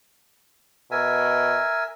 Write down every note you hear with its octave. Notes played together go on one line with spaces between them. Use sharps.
B2 A#4 E5 G#5